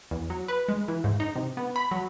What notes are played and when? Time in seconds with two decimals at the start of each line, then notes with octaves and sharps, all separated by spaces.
0.11 E2
0.30 F#3
0.48 B4
0.68 G#3
0.88 E3
1.04 G#2
1.20 D#4
1.36 C3
1.57 B3
1.76 B5
1.91 F#3